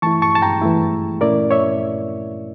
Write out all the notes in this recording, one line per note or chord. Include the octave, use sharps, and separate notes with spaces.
E3 A3 E4 A5 C#6
A5 C#6
A5
G5 A#5
E3 A3 E4
A#2 A3 C#4 E4 A#4 D5
C#5 E5